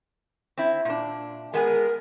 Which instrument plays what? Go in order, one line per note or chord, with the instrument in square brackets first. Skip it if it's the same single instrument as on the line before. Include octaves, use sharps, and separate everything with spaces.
[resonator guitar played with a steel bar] C4 E4
A#2 D4
[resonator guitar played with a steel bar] G#3 B3 G#4 [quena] A#4